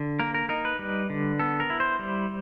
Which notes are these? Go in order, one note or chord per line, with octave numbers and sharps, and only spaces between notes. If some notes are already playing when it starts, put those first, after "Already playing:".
Already playing: D3
A#3 A#4
A#4
D#4 A#4
B4
G3
D3
B3 A4
A#4
E4
C5
G3